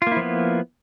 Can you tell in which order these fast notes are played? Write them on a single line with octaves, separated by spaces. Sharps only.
F4 A#3 E4 F3 B3